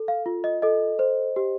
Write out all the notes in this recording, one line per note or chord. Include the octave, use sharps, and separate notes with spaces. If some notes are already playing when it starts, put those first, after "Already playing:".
Already playing: A4
F5
F4
D#5
A4 D#5
C5
G4